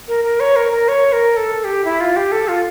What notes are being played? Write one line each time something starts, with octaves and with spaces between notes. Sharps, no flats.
A#4
A#4
C#5
A#4
A#4
C#5
A#4
A4
A4
G4
E4
F4
G4
A4
F4